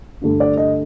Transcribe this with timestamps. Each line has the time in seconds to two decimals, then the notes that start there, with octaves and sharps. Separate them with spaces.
0.22 G2 D3 A3
0.40 D5
0.57 D#5